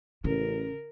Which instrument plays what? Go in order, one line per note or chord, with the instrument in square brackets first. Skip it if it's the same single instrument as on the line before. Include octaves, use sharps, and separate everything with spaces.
[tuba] A1 [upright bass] C#3 [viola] A#4